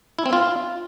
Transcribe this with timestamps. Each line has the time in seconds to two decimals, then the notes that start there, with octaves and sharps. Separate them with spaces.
0.19 E4
0.26 C4
0.33 F4